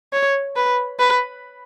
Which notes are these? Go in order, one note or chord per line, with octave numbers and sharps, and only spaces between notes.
C#5
B4
B4